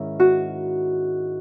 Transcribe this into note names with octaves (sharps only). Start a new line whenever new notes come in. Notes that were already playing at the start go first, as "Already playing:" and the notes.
Already playing: G#2 D#3 C#4 E4
F#4